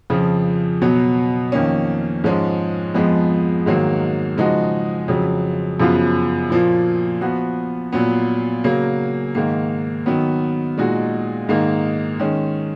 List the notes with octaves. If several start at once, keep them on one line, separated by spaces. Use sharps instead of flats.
F2 C#3 F3
B2 F#3 B3
F2 D#3 A#3 C#4
G#2 F3 G#3 C#4
F2 F3 G#3 B3
G#2 D#3 F#3 A#3
C#3 F3 G#3 D#4 F#4
F2 C#3 F#3
F#2 C#3 F3 B3 F4
A#2 F3 A#3
F3 B3 F#4
A#2 F#3 B3
C#3 F#3 A#3
G#2 D#3 A#3
D#3 F#3 B3
A#2 G#3 D#4 F#4
G#2 D#3 A#3 D#4
D#3 G#3 C#4